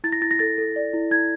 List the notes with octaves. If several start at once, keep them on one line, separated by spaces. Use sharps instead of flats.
E4 A6
A#6
E4 A6
A#6
A4 A6
A4
D5
E4
E4 G#6